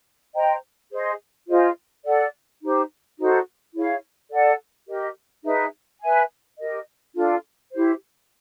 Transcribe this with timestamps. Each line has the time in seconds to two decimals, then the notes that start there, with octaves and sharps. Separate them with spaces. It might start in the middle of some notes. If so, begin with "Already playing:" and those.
0.34 C5 D#5 G5 A#5
0.91 G#4 C5 D#5
1.48 F4 G#4 C5 D#5
2.05 A4 D5 F#5
2.61 D#4 G4 C5
3.18 D#4 F#4 A4 C5
3.74 E4 G#4 C#5 F5
4.31 A4 D5 F#5
4.88 G4 A#4 D#5
5.45 D#4 G#4 B4 E5
6.01 B4 E5 G#5
6.58 G4 A#4 D#5
7.15 D4 F4 A4
7.72 E4 G4 C5